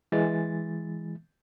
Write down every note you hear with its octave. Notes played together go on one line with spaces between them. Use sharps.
E3 G#3 A6